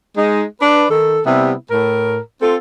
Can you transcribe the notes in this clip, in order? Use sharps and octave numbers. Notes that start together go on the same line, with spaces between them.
G#3 D#4
D4 B4
D#3 A4
C3 G3 B3 E4
A2 A#4
C4 F4 A4